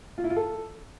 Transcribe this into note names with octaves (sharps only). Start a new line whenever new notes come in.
F4
E4
F4
A4